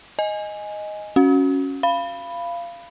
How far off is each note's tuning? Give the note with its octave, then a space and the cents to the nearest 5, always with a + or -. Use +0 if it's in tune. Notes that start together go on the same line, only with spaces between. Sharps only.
D#5 +0 G#5 +0
C#4 +0 F#4 +0
F5 -20 B5 +0